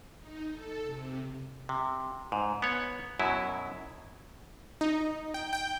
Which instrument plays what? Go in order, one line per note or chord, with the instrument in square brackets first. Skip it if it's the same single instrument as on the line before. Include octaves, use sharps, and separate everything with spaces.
[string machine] D#4
A4
C3
[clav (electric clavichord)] C3
G#2
B3 C#5
F#2 B2 F#3 E4
[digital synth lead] D#4
G5
G5